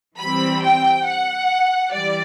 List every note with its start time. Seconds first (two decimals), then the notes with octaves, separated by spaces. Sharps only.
0.19 E3 G3 C4 B5
0.62 G5
1.05 F#5
1.93 E3 G3 D5